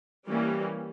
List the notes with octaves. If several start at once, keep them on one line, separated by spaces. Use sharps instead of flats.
E3 G3 A#3 C#4